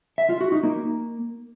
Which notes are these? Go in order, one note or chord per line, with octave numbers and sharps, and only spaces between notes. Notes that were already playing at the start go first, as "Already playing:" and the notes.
E5
F4
F#4
D#4
A#3